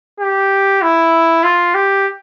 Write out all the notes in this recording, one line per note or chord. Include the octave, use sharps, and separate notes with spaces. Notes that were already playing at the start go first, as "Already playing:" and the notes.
G4
E4
F4
G4